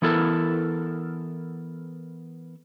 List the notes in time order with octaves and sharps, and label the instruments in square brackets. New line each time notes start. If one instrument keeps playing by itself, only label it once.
[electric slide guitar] E3 B3 E4 A4 A#4